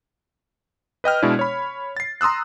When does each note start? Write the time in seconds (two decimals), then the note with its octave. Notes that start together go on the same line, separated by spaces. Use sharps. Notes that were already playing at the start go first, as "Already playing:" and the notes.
1.04 B4 D#5 G5 F6
1.22 B2 G#3 D4 E4 D5
1.39 C#5 B5
1.97 A6 C7
2.21 A#5 C6 D#6 E6 F#6